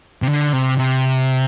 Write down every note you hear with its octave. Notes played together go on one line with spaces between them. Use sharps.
C3
D3
C3
C3